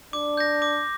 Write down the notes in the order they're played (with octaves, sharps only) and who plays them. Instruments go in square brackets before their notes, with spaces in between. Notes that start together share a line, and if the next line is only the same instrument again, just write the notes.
[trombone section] D4 [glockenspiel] D6
[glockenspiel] G6 A#6
D6